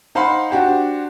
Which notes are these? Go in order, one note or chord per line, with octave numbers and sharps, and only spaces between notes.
D#4 C5 F5 F#5 B5 C6
D4 F#4 G4 C5